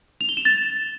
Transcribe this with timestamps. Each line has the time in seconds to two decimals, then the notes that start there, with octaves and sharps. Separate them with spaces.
0.21 F7
0.29 G7
0.37 E7
0.45 A6